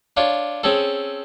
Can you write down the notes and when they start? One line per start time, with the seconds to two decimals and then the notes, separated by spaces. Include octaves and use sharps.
0.17 D4 F4 C#5
0.63 C4 C#4 G#4 A4